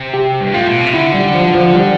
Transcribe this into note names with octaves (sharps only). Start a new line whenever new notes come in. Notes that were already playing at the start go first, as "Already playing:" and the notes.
Already playing: C3
G4
G2
A2 F4
B2
C3
D3 E4
G3
F3
F3
G3